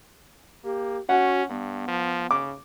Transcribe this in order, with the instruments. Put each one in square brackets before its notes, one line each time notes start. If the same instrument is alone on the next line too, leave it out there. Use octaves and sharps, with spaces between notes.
[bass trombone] A#3 [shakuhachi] G4
[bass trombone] C#4 [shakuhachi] F#4 [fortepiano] F#5
[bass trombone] G2 [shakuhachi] B3
[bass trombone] F3
[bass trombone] C#3 [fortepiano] D6